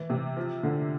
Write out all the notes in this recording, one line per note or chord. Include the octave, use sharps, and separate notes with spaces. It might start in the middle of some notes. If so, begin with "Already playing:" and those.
Already playing: E3
C3
F3
D3